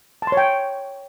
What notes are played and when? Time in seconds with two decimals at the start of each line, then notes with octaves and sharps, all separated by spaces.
0.22 A5
0.27 C6
0.32 C#5
0.37 G5